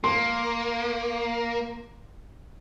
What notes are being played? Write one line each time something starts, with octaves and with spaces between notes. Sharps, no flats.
A#3 C6